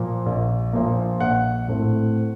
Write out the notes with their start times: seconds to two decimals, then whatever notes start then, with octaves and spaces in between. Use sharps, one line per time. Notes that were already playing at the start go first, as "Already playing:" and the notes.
Already playing: A#2 F3 A#3
0.26 A#1
0.73 A#2 F3 A#3
1.20 A#1 F#5
1.68 A2 A3 C4